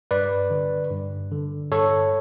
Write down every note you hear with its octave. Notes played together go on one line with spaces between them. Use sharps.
G2 B4 D5
D3
G2
D3
G2 A4 C#5